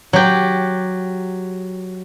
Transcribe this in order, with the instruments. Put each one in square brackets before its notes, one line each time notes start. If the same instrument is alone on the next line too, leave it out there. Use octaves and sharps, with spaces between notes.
[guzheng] F#3 G4